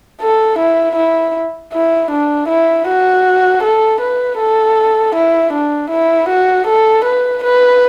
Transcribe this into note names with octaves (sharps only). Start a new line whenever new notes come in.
A4
E4
E4
E4
D4
E4
F#4
A4
B4
A4
E4
D4
E4
F#4
A4
B4
B4